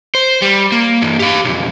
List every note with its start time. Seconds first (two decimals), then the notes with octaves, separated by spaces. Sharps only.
0.15 C5
0.42 G3
0.72 A#3
1.02 G2 E3
1.19 G4 F5
1.44 B1 F2